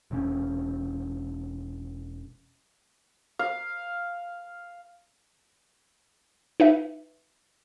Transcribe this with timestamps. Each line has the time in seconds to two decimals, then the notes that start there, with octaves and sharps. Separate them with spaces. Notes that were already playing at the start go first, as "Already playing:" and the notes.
0.11 E1 C3 C4 C#4
3.39 F5
6.60 D#4 B4 E5